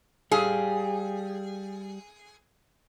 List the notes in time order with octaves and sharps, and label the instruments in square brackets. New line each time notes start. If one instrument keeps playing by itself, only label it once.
[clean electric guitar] G3 G4 F5 [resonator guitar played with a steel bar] G#4